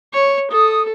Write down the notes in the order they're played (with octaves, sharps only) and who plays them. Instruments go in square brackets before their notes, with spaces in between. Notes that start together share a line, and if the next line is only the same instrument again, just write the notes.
[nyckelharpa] C#5
[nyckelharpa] A4 [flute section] D#6